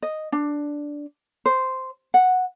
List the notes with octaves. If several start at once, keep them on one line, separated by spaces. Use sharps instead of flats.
D#5
D4
C5
F#5